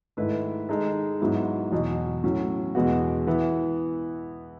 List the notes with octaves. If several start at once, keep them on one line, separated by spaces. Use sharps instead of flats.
G#2 D#3 A3 E4 B4
D#3 G#3 D#4 A4
G#2 F#3 B3 E4
E2 B2 F#3
A2 F#3 C#4
E2 B2 G#3 B3 F#4
E3 B3 E4